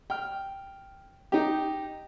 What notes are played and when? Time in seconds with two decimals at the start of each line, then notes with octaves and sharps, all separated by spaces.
0.10 G5 F6
1.32 D#4 G4